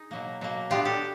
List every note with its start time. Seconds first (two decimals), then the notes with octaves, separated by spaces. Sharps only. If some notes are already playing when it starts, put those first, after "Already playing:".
Already playing: D#4 G#4
0.11 B2 F#3 A#3
0.41 B2 F#3 A#3
0.70 A#2 F#3 B3 D4 F4 G4
0.85 G4 A4